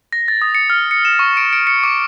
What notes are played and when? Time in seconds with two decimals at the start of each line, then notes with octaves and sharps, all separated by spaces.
0.13 A#6
0.28 A6
0.42 D#6
0.55 C#7
0.70 F6
0.91 C#7
1.05 E7
1.19 C#6
1.37 D7
1.53 D7
1.67 C#7
1.84 D6